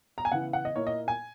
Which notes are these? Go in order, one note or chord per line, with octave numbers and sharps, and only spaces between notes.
A#5
G#5
C#3 E3 B3 E4 F#5
F#5
D#5
A#2 A#3 E4 C#5
D#5
G#5